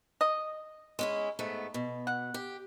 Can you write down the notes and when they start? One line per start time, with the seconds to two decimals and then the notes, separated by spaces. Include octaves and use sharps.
0.21 D#5
0.99 G#3 C#4 E4
1.39 G#2 A3 B3
1.74 B2
2.07 F#5
2.34 G4